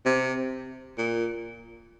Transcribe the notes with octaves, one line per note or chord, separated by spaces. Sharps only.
C3
A#2